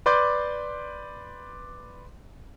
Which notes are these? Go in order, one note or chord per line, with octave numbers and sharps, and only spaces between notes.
B4 D5 C6 D6 G6